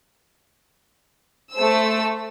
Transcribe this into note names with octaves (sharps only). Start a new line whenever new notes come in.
A3 C5 E6